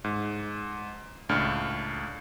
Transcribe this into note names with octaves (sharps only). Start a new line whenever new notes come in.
G#2
C#2 A2 D4 F6